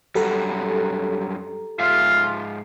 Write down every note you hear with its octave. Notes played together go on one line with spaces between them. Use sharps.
F#2 G3 F#4 G4 A4 A#5
G#2 F4 E5 F5